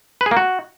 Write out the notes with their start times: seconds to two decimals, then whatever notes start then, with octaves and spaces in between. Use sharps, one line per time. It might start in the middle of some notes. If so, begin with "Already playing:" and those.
0.21 B4
0.26 G#4
0.31 A#3
0.37 F#4